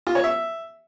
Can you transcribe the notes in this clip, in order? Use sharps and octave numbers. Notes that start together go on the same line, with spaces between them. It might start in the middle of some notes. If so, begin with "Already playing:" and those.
F4
C#5
E5